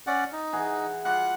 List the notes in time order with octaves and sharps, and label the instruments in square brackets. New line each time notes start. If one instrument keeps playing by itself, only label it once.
[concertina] C#4 D5 F#5
D#4
[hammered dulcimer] E3 F#4 G#4
[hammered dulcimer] G3 F4 F#4 [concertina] F#5 F#6